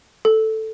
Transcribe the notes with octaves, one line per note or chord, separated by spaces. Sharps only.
A4